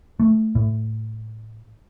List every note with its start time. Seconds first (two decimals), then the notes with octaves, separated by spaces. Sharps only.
0.20 A3
0.55 A2